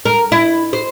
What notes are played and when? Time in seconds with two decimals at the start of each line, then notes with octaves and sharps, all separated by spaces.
0.05 A#4
0.32 E4
0.73 C5